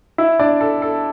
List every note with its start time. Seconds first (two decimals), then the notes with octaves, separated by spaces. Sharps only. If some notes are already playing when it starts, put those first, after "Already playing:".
0.18 E4 E5
0.39 D4 D5
0.61 A4
0.82 A4